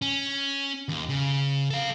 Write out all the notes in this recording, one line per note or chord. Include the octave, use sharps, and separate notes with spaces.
C#4
D#2
C#3
A4 F5